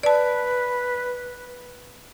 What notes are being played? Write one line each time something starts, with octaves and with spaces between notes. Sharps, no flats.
B4 D5 A5